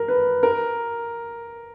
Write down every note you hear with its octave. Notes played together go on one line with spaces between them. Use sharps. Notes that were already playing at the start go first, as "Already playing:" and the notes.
Already playing: A#4
B4
A#4